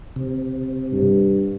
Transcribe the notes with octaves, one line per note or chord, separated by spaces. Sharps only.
C3
G2